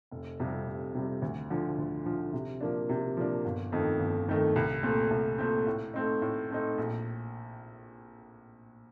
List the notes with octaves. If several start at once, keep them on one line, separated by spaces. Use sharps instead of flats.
F1
F2 C3 G3
F1
F2 C3 G3
D2
D3 F3
D2
D3 F3
C3
F3 A#3 D4
C3
F3 A#3 D4
G1
F2 D#3 A3 D#4
G1
F2 D#3 A3 D#4
C2
A#2 A3 C4
C2
A#2 A3 C4
A2
A3 C4 D#4
A2
A3 C4 D#4
A#1